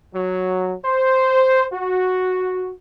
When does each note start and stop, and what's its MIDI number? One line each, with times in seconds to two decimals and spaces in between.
0.14 0.75 54
0.85 1.66 72
1.73 2.72 66